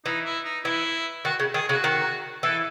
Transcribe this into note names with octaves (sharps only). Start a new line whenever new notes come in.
E3 D#4
E4
D#4
E3 E4
D#3 F#4
C#3
D#3 G#4
C#3 F#4
D#3
E3 A4